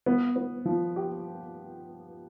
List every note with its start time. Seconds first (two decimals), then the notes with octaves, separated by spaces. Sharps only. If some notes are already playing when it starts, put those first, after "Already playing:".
0.06 B3
0.36 B3
0.65 F3
0.96 G4